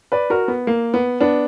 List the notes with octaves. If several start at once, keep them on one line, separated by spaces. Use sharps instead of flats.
B4 D5
F#4 A#4
B3
A#3
B3
B3 D4